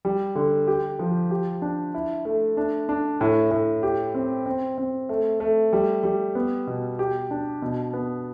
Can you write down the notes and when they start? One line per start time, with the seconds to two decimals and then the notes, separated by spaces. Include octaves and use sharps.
0.05 G3
0.36 D3
0.67 G4
0.99 F3
1.31 G4
1.62 D4
1.94 E4
2.25 A3
2.57 D4
2.89 D4
3.21 A2
3.51 A2
3.83 G4
4.15 C4
4.46 C4
4.78 C4
5.09 A3
5.40 A3
5.73 G3
6.03 G3
6.35 B3
6.67 B2
6.99 G4
7.31 D4
7.62 B2
7.93 B3